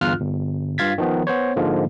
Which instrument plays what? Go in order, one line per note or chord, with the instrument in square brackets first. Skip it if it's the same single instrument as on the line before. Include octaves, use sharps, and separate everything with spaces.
[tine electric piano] G1 E2 G2 F4 F6 F#6
G1
G2 F4 F5 G#6 A6 B6
D#3 F3 B3
B3 C5 C#5
G#2 D3 F3 G#3 A#3